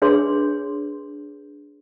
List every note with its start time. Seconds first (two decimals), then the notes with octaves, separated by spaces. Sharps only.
0.02 D4 G#4 B4 C#5 C6